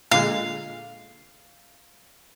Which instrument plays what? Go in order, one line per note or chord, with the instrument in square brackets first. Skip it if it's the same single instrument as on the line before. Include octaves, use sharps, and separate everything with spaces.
[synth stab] A#2 D3 G#3 [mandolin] F5